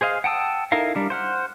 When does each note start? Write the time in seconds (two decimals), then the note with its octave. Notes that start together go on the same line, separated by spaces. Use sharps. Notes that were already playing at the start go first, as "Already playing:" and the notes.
0.01 G#4 C5 D#5 F5
0.24 F#5 G5 A5 D#6 E6
0.72 D#4 E4 A4 A#4 F5
0.95 G3 D4 A#4
1.10 C5 F#5 F6